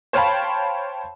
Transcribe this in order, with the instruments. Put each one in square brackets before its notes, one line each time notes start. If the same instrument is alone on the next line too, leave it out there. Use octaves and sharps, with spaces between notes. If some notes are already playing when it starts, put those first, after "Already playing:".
[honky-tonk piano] C5 C#5 F5 G5 A5 B5